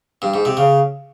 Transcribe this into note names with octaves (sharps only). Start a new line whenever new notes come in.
G2
G#2
C3
C#3